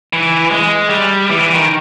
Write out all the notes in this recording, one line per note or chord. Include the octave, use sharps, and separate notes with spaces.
E3
G#3
G3
E3
E3
D#3